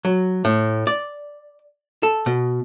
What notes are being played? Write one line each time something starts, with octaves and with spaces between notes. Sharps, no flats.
F#3
A2
D5
A4
B2